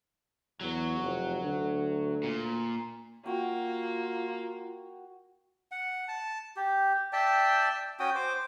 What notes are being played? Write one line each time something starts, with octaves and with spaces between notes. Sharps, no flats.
E2 F#3
F1
D2
A#2
A#3 F4 F#4 G5
F#5
A5
G4
D5 E5 G5 A5
C#4 F#4 G5 D#6
C5 D6